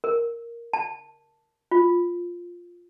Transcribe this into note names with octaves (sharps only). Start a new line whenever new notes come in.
A#4
A5
F4